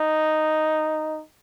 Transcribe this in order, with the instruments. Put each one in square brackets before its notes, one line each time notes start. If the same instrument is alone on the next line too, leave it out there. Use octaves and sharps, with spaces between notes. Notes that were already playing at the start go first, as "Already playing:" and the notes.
Already playing: [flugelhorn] D#4